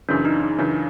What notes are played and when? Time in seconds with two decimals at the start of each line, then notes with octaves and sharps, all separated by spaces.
0.09 F#2 C#3 E3 D4
0.25 D#4
0.41 D#4
0.58 F#2 C#3 E3 D4